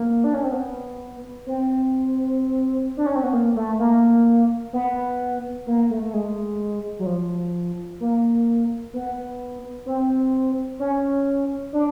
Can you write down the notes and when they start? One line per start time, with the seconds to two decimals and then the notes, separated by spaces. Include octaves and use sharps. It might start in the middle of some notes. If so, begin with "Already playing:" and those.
Already playing: A#3
0.24 D4
0.34 C#4
0.44 C4
0.52 B3
1.47 C4
2.97 D4
3.06 C#4
3.16 C4
3.23 B3
3.33 A#3
3.56 A3
3.79 A#3
4.73 B3
5.67 A#3
5.90 A3
6.03 A3
6.14 G#3
6.99 F#3
7.06 F3
8.00 A#3
8.93 B3
9.86 C4
10.79 C#4
11.73 D4